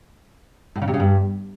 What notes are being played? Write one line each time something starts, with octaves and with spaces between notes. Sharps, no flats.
A2
C#3
C3
C#3
G2